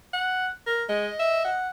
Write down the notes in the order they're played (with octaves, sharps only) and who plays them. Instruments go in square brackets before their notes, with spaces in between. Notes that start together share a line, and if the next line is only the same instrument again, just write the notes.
[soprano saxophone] F#5
A#4
[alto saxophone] G#3 [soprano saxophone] D#5
[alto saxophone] E5
F#5